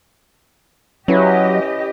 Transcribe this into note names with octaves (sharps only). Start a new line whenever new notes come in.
F#3 C#4 E4 G4 B4 D#5